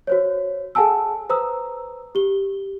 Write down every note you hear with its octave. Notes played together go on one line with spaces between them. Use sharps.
F#4 C5 C#5
G#4 A4 F#5 G#5 A5 E6
B4 C5 A#5 D#6 E6
G4 G7